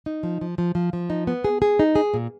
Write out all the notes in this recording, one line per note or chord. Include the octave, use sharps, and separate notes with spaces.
D#4
F3
F3
F3
F3
F3
D#4
B3
G#4
G#4
D#4
G#4
A#2